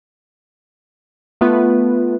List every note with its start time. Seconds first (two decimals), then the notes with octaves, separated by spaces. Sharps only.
1.41 A3 B3 F4 B4